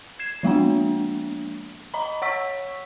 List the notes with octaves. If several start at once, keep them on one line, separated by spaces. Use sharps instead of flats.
G#6 C7 E7
F3 G#3 A#3 B3 D4
D#5 A#5 B5
C#5 F#5 C#6 E6 B6